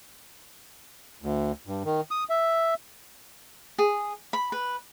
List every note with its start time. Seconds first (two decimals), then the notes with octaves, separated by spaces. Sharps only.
1.22 D2
1.67 G2
1.85 D#3
2.11 D#6
2.29 E5
3.78 G#4
4.33 B5
4.52 B4